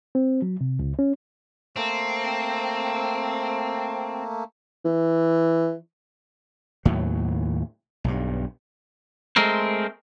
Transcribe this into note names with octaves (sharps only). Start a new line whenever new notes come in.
C4
F#3
C3
C#2
C#4
A3 A#3 C4
E3
D#2 A2 F#3
B1 G2
G#3 A3 C4 A#4 C5